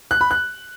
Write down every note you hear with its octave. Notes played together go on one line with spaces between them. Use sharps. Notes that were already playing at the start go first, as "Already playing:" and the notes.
F#6
B5
F#6